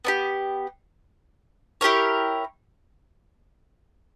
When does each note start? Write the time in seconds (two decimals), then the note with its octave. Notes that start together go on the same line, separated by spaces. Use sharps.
0.05 B3 D4 G4
1.81 E4 G4 A#4 C#5